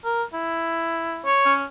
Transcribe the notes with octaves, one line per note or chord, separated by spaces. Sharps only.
A#4
E4
C#5
C#4